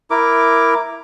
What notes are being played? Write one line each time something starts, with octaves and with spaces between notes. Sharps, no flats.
E4 A#4 D6